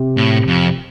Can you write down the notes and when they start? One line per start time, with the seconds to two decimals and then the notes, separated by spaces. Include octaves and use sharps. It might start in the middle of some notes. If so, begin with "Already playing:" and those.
Already playing: C3
0.17 A2
0.47 F2